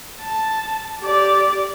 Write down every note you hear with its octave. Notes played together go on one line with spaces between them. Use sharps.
A5
G4 D5